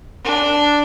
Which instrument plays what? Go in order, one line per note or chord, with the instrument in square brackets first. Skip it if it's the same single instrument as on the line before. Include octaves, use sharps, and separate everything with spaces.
[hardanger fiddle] D4